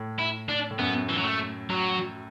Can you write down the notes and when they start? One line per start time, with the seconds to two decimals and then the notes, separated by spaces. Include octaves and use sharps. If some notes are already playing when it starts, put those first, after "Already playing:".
Already playing: A2
0.19 E4
0.49 D4
0.71 A2
0.79 F#2 B3
1.09 E3
1.18 F#3
1.24 A3
1.70 F#3